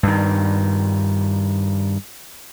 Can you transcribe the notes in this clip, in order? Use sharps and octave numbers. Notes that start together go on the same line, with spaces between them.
G2 D#3